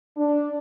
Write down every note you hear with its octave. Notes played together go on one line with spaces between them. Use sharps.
D4